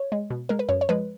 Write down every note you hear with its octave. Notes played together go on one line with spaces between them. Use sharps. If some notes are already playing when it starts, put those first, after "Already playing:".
Already playing: C#5
G#3
B2
G#3 A#4
B4
F#2 C#5
C#5
F3 G#3 B4